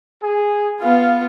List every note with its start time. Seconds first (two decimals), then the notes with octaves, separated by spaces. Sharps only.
0.21 G#4
0.81 B3 F4 F5